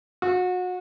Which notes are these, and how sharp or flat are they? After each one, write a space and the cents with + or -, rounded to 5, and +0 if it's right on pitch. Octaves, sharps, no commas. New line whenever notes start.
F#4 -30